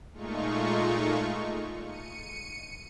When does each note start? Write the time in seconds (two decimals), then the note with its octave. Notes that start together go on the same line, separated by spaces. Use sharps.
0.13 A#2 G#3 A3 D#4 F4 C#6
1.82 C#7 D#7